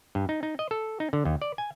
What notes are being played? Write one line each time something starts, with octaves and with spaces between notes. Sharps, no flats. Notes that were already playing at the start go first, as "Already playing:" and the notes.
G2
D#4
D#4
D#5
A4
D#4
D3
D#2
D5
G#5